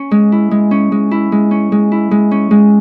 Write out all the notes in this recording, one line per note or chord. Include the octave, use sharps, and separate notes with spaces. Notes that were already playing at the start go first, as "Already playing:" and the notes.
Already playing: C#4
G#3
E4
G#3
C#4
G#3
E4
G#3
C#4
G#3
E4
G#3
C#4
G#3